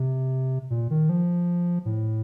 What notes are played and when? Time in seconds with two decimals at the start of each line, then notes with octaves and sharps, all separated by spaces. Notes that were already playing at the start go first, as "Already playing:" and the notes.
Already playing: C3
0.70 A#2
0.90 D#3
1.09 F3
1.85 A2